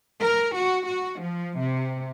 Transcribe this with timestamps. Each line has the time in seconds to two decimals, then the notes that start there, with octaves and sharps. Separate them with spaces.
0.22 A#4
0.56 F#4
0.86 F#4
1.22 F3
1.59 C3